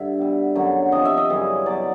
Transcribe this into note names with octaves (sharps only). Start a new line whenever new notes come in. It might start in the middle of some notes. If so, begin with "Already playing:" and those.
Already playing: G2 D3 E5
B2 G3
F#2 D3 F#3
C3 F3 D#5
E5
D#5
F#2 C#3 E3 G3
B2 F#3 D5